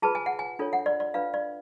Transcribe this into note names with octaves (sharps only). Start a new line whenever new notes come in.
F4 G#4 B4 A5
G#5
F#5
G#5
D4 F4 A4 C#5
F#5
D5
D5
D4 F4 B4 F5
D5